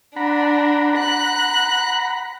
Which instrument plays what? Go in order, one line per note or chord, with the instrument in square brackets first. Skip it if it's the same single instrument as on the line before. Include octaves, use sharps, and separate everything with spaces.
[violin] D4 [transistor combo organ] F#5 A#5 B5
[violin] F#6